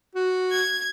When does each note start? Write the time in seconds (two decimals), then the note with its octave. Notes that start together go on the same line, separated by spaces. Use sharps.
0.15 F#4
0.51 G#6